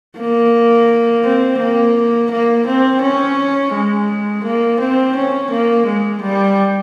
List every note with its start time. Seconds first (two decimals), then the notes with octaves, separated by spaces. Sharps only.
0.18 A#3
1.24 C4
1.59 A#3
2.31 A#3
2.67 C4
3.02 C#4
3.74 G#3
4.44 A#3
4.80 C4
5.16 C#4
5.51 A#3
5.86 G#3
6.22 G3